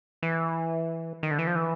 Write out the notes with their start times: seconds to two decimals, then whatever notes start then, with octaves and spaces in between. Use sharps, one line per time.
0.23 E3
1.23 D#3
1.31 D3
1.39 E3
1.47 F3
1.55 E3